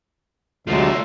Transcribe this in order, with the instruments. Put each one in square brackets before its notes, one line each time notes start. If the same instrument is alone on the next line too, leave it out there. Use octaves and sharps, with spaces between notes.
[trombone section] D2 [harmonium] C3 F#3 G#3 [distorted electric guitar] A3 F4